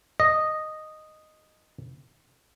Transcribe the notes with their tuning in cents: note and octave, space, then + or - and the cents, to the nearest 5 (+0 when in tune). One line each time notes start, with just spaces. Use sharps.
D#5 -5